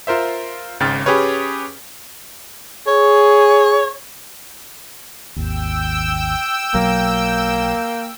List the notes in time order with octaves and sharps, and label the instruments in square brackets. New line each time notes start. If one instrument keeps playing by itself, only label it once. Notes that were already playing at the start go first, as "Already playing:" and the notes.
[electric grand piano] F4 A#4 C5 E5
G#1 G#2 C#3 G5 F6 A6
C#4 G4 G#4 B4 C#5
[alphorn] G#4 [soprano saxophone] C#5
[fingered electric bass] G#1 D#2 [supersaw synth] G5 E6
[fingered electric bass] B1 F#3 [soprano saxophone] A#3